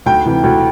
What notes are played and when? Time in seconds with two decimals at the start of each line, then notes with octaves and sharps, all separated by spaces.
0.06 D2 G5
0.25 C3 E3
0.43 D2